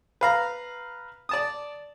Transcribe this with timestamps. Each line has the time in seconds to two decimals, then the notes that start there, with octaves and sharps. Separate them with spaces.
0.21 B4 F5 A#5
1.29 D5 A5 D#6